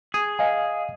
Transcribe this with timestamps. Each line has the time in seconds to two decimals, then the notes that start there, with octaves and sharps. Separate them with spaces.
0.14 G#4
0.39 D#5 F5 G#5